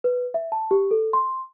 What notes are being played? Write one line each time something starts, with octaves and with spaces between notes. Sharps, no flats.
B4
E5
A5
G4
A4
C6